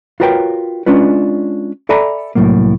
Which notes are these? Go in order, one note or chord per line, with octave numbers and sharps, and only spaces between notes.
F4 F#4 A#4 B4 C#5 G5
G#3 C#4 D4 F4 B4
A4 D5 E5 G#5 A#5 B5
C2 A2 C#3 F#3 A#3